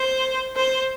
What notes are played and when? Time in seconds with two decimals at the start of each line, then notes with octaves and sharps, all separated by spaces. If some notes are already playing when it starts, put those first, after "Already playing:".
Already playing: C5
0.56 C5